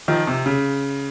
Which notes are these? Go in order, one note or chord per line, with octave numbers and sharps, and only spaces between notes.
D#3 F3
C3
C#3